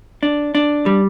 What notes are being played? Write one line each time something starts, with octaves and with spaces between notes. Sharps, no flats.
D4
D4
G3